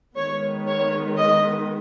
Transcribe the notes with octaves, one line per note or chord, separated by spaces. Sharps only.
D#3 G#3 B3 C#5
C#5
D#5